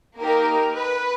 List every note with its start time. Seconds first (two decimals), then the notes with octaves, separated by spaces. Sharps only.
0.18 A#3 D#4 G4 A#4
0.74 B4